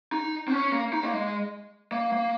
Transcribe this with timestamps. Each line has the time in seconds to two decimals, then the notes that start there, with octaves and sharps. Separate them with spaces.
0.12 D#4
0.48 C4
0.52 C#4
0.72 A#3
0.93 D#4
1.03 A#3
1.13 G#3
1.92 A#3
2.13 A#3